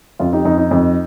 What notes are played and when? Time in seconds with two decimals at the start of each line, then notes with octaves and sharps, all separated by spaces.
0.19 F2 F4
0.33 D#4 G4
0.45 F2 D#4
0.58 D#4
0.71 F2